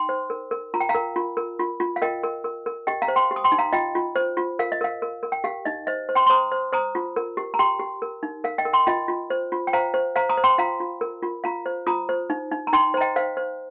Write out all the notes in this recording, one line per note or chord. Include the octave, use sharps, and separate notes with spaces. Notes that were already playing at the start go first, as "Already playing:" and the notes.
Already playing: D#4 G5 C6
C5
A#4
A#4
F4 A#5
G5
F5 A#5
A#4
F4
A#4
F4
F4
F5
A#4 D#5 G5
A#4
A#4
A#4
G4 D#5 G5
F5 A#5
C5
G5 C6
G4
D#6
G5 C6
D#4
F5 A#5
F4 D#5 G5
F4
C5
F4
A#4 F5
D#5
A#4 F5
A#4
A#4
G5
G4 F5
D#4 D#5
C5 D#5
C5
G5 C6
C6
C5 A#5 D#6
C5
C5 A#5 D#6
F4
A#4
G4
A#5
G4 G5 C6
G4
A#4
D#4
A#4 F5
D#5 G5
A#4
G5 C6
F4 D#5 G5
F4
C5
F4
G5
C5 F5 A#5
C5
C5 F5 A#5
A#5 D#6
C5
G5 C6
F4 F5 A#5
F4
A#4
F4
F4 F5 A#5
C5
F4 A#5 D#6
C5
D#4
D#4
A#5
D#4 G5 C6
C5 A#5
D#5 G5
C5 F5
C5